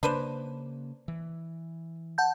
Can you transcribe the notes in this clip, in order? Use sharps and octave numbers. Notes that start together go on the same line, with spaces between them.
C#3 A#3 D4 B4 C5
E3
F#5 A5 G6